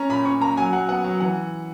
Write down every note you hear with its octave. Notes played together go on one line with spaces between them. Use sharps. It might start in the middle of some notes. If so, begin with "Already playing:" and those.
Already playing: C#4 A#5
A#2 B5
C#4 C#6
A#3 A#5
F#3 G#5
F#3 F#5
B3 F#5
F#3
E3 F#5